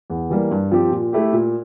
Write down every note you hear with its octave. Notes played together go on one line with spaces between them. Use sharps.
E2
E3 G3 A#3
G2
F3 C4 G4
A#2
A3 E4 G4
A#2